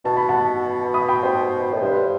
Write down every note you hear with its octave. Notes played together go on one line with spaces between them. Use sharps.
B2 A5
B5
F#5 A5
B5 D#6
G5 B5
C5
A2
G2 C5
B4